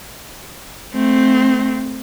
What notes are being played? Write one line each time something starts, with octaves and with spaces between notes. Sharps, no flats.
A3 C4